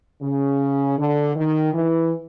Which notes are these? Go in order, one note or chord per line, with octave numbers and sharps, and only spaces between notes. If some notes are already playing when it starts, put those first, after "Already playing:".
C#3
D3
D#3
E3